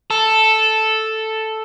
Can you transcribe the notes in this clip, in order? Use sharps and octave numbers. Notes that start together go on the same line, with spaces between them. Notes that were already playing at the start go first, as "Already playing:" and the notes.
A4